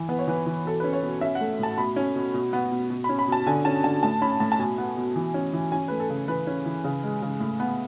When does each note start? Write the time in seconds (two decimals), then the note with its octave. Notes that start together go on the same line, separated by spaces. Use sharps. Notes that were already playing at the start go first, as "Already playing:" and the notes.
Already playing: E3
0.09 B3 B4
0.19 C#5
0.27 E3 B4
0.46 E3
0.65 B2 A4
0.80 C#4 B4
0.93 C#5
1.03 B2
1.21 C#4 E5
1.35 F#5
1.40 A3
1.59 A2 A5
1.78 B2 B5
1.96 C#4
2.15 B2
2.34 B2
2.53 B3
2.71 B2
2.90 B2
3.04 B5
3.09 C#4
3.19 B5
3.28 B2 A5
3.47 D3 G#5
3.65 C#4 A5
3.84 D3 A5
4.03 A2 A5
4.22 C#4 B5
4.40 A2 A5
4.52 A5
4.59 B2 G#5
4.78 B3
4.97 B2
5.16 E3
5.34 C#4
5.53 E3
5.72 C#4 G#5
5.88 A3 B4
6.00 A4
6.10 C#3
6.28 E3 B4
6.47 C#4
6.66 E3
6.84 C#3
7.03 G#3
7.22 C#3
7.40 A2
7.60 B3